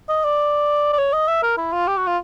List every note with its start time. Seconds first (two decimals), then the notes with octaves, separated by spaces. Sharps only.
0.09 D#5
0.24 D5
0.93 D5
0.98 C#5
1.13 D#5
1.28 E5
1.43 A#4
1.58 E4
1.73 F4
1.87 G4
1.97 F#4
2.07 F4